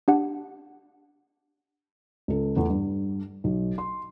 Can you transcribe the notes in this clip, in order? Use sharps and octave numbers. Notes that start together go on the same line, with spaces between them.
D4 G4 F#5
C#2 A4
E2 A3
G2
B1
C6